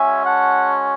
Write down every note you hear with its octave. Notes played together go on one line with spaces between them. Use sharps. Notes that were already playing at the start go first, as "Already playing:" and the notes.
Already playing: G#3 C#4 F#4 E5 G#5
F#5 A5